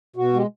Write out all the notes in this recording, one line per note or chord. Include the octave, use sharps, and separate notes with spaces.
B2 F#4
G#3 G4